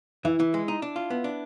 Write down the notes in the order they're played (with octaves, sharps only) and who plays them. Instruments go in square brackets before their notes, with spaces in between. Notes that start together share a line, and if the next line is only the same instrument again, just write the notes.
[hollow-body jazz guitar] E3 [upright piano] E4
[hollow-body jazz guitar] E3
G#3
D#4
D4
F4
B3
D4